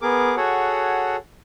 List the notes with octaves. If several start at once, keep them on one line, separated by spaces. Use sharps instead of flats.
B3 G#4 A#4 D6
F#4 G#4 A4 C#5 F#5